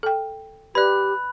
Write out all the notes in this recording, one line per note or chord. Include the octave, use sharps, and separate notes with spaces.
A4 G5
G4 B4 D5 B5 F#6